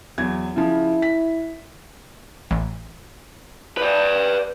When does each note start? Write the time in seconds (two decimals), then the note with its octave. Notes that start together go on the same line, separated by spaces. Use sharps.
0.18 E2 F#3 G#6
0.56 C#3 F3 E4
1.02 B6
2.51 A1
3.77 B4 D5